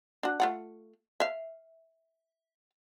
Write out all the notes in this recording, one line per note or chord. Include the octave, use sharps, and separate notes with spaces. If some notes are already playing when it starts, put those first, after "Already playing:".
D4 F#4
A3 F4 F#5
E5 F5